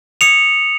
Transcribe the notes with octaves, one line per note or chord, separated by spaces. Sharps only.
D#6 C#7 F7